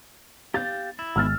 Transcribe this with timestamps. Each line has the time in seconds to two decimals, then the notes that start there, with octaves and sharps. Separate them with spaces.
0.54 G4 F5 G6 A6
0.99 E4
1.16 G#1 D#3 G#3 E6 F6 A6